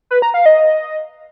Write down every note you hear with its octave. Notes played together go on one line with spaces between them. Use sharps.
B4
A#5
F5
D#5